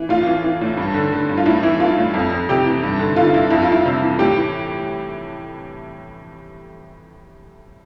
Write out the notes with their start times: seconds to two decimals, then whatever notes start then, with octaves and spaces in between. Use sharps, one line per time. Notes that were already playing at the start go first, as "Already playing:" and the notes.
Already playing: E3
0.09 A2 F4
0.27 E3
0.44 E3
0.61 A2
0.77 G2
0.94 D3
1.12 D3
1.29 G2
1.37 F4
1.46 A2 E4
1.63 E3 E4
1.80 E3 F4
1.97 A2
2.14 F2
2.31 F2
2.49 C3 G4
2.65 E3
2.83 G2
2.99 D3
3.16 D3 F4
3.33 G2 E4
3.50 F2 E4
3.62 F4
3.68 F2 E4
3.85 C3
4.02 E3
4.19 A2 G4
4.37 E3